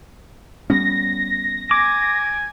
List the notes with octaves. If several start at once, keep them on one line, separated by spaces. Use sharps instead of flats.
G3 B3 C#4 A#6
G#5 D6